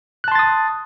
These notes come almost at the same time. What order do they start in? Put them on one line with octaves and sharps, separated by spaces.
F#6 A5 C6 A6 D#6